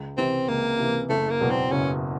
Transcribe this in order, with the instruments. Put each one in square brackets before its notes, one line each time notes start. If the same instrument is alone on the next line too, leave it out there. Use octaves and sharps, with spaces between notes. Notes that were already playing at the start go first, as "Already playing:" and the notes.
Already playing: [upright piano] C#2
[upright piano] C3 E3 [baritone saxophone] C4
[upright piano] C#2 [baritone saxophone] A#3
[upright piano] C3 E3
[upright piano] F#1 [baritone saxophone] A3
[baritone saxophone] A#3
[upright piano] E2 B2 F#3
[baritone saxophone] C4
[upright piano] F#1 [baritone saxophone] C#4